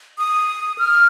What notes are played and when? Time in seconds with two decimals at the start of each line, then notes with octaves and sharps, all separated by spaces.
0.18 D#6
0.78 F6